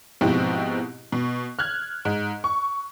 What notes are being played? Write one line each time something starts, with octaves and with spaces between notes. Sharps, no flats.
G#2 B2 F3 C4 E4 G4
B2
F6 F#6 G#6
G#2
C#6